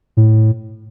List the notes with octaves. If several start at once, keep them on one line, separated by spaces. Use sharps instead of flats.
A2